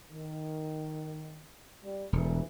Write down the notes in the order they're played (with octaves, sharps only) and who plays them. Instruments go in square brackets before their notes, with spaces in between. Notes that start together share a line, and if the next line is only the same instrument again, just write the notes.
[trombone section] D#3
G3
[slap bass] E1 [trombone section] D2 G2 E3